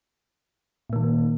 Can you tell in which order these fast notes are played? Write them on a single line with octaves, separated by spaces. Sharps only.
A#2 A#3 D#3